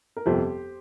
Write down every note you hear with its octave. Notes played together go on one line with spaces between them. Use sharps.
A#4
G1 F2 C3 F3 G4 C5